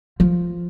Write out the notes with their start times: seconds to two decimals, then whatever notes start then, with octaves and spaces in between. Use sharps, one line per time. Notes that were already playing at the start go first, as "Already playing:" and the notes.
0.20 F3